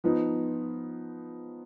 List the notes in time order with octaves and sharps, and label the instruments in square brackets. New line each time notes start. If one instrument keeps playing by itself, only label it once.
[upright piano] F3 B3 D#4